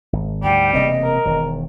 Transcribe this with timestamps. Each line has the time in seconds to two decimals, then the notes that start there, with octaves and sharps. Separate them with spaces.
0.13 G#1
0.43 D2 G#2 G3 G5
0.74 E1 C3 A#3 D#5
1.03 A#4
1.26 E1 D#3